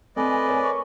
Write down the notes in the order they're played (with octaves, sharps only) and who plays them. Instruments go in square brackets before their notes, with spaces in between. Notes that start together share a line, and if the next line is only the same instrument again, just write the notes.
[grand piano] A3 C4 [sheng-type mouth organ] B4 D5 D#5 [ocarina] G#5
[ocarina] G#5
[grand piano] A#4 C#5
[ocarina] C#6